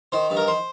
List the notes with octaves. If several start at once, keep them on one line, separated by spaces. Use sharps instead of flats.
D#3 C5
G2
A#4
C5